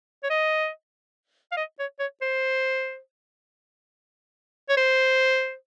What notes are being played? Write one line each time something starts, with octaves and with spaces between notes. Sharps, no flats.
C#5
D#5
F5
D#5
C#5
C#5
C5
C#5
C5